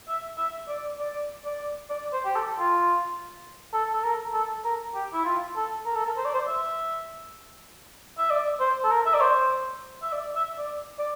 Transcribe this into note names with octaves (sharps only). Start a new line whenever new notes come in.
E5
E5
D5
D5
D5
D5
C5
G4
A4
F4
A4
A4
A#4
A4
A#4
G4
E4
F4
A4
A#4
A4
A#4
C5
D5
C5
E5
E5
D5
C5
A4
A#4
E5
D5
C5
E5
D5
E5
D5
D5